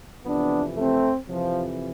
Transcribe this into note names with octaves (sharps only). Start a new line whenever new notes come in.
F2 C3 E3 B3 D4
A3 C4
F2 C3 E3 F3